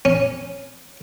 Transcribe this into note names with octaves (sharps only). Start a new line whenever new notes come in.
C#4